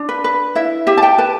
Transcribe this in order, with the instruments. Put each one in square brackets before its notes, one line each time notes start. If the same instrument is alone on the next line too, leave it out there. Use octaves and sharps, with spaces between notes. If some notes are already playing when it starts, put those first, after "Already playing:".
Already playing: [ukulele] D4
B4
B4
E4 E5
G4 E5
A5
G5
B4 A5